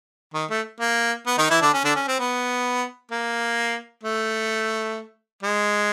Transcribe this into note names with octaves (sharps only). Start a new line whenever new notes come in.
D#3
A3
A#3
B3
D#3 D#4
E3 E4
D3 D4
C#4
D3 D4
C#4
C4
B3
A#3
A3
G#3